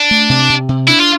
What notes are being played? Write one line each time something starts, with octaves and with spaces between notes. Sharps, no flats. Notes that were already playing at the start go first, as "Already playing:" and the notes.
Already playing: D4
A3
C3
C3
C3
D4 E4
F4